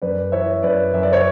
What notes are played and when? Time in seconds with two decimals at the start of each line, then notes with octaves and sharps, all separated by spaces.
0.02 F#2 B4 D5
0.32 E3 C#5 E5
0.63 F#2 B4 D5
0.93 F#2 E5
1.03 D5
1.13 C#5